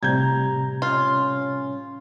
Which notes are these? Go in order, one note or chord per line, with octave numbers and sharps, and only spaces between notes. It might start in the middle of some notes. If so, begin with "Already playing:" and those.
A2 C3 G3 A#5 G6 G#6
C#4 F4